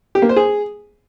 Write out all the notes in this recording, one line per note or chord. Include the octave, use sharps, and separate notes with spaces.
G4
A#3
C5
G#4